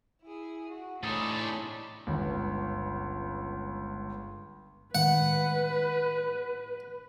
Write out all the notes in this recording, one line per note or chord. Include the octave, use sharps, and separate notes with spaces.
E4 G#4
F#4
A2 C3 D4 D#4 G#4 A4 C#5 B5
G1 C#2
A2 D#3 G#3 B4 F#5